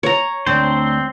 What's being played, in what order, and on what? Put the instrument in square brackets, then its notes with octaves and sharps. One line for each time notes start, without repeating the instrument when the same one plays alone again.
[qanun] C#5 A#5
[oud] D2 D4 [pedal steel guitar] C4 C5